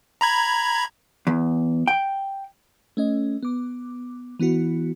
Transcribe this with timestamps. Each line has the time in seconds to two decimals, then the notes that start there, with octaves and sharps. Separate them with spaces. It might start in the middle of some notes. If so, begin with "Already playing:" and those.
0.21 A#5 B5 G#6
1.27 E2
1.88 G5
2.97 A3 C#4 D#5
3.43 B3 D6
4.40 E3 B3 E4 F#4